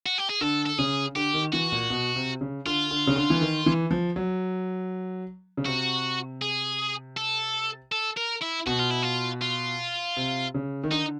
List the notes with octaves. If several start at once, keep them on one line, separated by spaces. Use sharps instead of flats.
F#4
G4
G#4
D3 A4
A4
C#3 G#4
D3 G4
D#3
E3 F#4
A#2
B2
C3
C#3
D3 F4
D3
C#3
D3
E3
D#3
E3
F3
F#3
C#3
C3 F#4
G#4
A4
A4
A#4
E4
B2 F#4
F4
E4
F4
F4
C3
C#3
D#3
D3 D#4